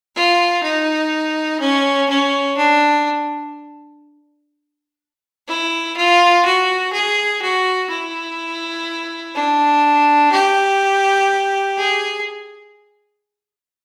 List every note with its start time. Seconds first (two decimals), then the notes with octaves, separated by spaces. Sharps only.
0.16 F4
0.63 D#4
1.60 C#4
2.09 C#4
2.57 D4
5.48 E4
5.96 F4
6.45 F#4
6.93 G#4
7.42 F#4
7.90 E4
9.35 D4
10.32 G4
11.77 G#4